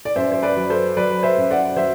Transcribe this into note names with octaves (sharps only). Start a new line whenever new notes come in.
D5
F#2 C5 E5
C5
B4 D5
F#3
A4 C5
F#3 B4 D5
C5 E5
F#2
D5 F#5
F#3 C5 E5